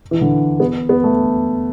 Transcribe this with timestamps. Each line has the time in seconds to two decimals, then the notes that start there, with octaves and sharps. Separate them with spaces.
0.11 E3
0.21 D3
0.60 B3
0.89 B3
1.04 A3